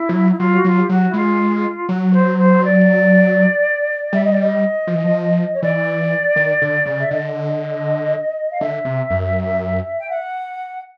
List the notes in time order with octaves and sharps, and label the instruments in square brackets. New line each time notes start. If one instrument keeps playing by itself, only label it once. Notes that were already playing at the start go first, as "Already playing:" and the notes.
Already playing: [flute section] E4
[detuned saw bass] F3
F#3
[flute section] E4
[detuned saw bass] F#3 [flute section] F4
[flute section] F#4
[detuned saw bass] F#3 [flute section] F4
[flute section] G4
[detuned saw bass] F#3 [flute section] F#4
[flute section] E4
[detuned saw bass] G#3 [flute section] F4
[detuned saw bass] F#3 [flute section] F#4
[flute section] C5
C5
D5
[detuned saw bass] G3 [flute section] E5
[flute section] D#5
D5
D#5
[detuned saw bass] F3
E3
F3
[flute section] C#5
[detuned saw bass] E3 [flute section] D5
[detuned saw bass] D#3
D3
C#3
[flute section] E5
[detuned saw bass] D3 [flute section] D#5
[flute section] F5
[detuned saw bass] D3 [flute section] E5
[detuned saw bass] C3
F#2
[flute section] G5
F#5